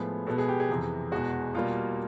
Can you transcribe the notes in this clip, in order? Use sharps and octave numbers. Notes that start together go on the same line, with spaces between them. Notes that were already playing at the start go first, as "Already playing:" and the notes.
Already playing: A2 F3 G#3 B3 G#4
B2 G#3 B3 A4
G#4
G4
G#4
F2 C3 E3
E2 B2 G#3 F#4
B2 G3 A#3 F4